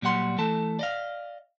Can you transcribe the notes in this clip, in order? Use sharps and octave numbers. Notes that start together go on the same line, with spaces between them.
A#2 F#3 G3 F#5 C6
E3 A3 A4 A5
D5 D#5 F5